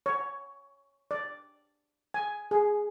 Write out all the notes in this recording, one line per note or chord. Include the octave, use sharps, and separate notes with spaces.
C#5
D5
G#5
G#4